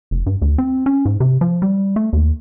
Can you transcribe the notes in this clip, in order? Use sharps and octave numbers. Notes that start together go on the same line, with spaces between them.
F1
G2
D2
C4
C#4
G#2
C3
F3
G3
A3
D#2